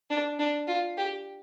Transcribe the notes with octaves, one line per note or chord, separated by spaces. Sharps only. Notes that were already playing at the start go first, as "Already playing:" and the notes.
D4
D4
F4
G4